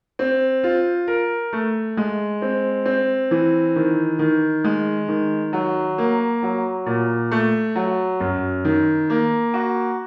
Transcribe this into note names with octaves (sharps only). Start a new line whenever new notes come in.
C4
F4
A#4
A3
G#3
C4
C4
E3
D#3
D#3
G#3
D#3
F#3
A#3
F#3
A#2
A3
F#3
F#2
D#3
A#3
F#4